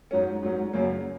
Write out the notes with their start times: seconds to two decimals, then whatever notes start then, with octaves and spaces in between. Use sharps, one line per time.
0.11 G#2 F#3 C#4
0.42 G#2 F#3 C#4
0.73 F#2 C#3 F#3 A#3